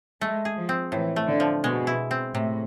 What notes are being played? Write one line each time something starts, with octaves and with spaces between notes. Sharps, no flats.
G#3 A3
G#4
F3
C4
A2 E3
A3
D3
F3
B2 G#3
E4
C4
A2 C3